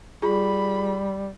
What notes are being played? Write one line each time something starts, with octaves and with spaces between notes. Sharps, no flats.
G3 F4 G#4 B5